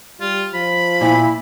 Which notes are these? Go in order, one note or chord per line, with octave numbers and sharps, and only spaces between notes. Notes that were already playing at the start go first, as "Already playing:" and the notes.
G3 F4
F3 B5
A#2 E4